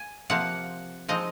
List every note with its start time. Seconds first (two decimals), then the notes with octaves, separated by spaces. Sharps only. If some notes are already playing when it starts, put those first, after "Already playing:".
Already playing: G#5
0.30 C3 F3 A#3 F#5
1.08 F3 G#3 C4 D#4 D#5